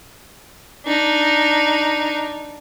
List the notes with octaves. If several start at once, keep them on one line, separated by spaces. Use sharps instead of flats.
D4 D#4